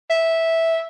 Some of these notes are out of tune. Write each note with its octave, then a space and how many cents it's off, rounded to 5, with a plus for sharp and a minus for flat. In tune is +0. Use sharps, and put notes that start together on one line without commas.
E5 -10